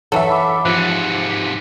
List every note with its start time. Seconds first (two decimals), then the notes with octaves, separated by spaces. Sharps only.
0.12 E3 F#3 A4 E5 F#5
0.29 F#5 B5 D6
0.65 G#2 C3 F3 F#6 B6 C#7
1.31 B6